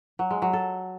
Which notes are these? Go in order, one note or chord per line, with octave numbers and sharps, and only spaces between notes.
F#3
G#3
F#3
A4